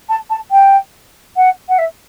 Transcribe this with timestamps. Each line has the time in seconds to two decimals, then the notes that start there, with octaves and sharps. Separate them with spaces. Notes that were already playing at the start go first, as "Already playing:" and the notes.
0.09 A5
0.30 A5
0.51 G5
1.36 F#5
1.69 F#5
1.78 E5